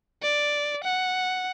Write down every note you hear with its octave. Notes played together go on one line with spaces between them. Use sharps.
D5
F#5